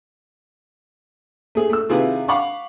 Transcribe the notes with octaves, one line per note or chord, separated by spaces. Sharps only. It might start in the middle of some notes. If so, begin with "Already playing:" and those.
A3 G#4
A3 E6
C3 D#3 E4 F4 G#4 B4
F5 F#5 B5 C#6 D6